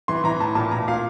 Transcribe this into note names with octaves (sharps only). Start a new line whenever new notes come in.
E3 C6
E3 A#5
A2 A5
A#2 A5
A#2 A#5
A#2 F5